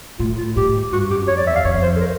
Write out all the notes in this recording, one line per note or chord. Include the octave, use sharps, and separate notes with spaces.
A2 F4
F4
G#2 G4
G2 F#4
F#2 G4
F2 C#5
D5
E2 E5
F5
F2 C#5
C5
A4
A#4